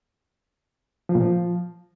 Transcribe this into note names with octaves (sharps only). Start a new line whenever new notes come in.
F3
A#2
F3